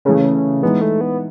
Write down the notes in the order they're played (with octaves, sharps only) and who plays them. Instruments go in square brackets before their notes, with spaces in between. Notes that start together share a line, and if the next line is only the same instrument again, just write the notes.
[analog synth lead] C#3 [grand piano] E3 A3 C#4
[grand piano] E3 G#3 D#4 G#4 [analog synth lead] B3
[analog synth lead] A3
B3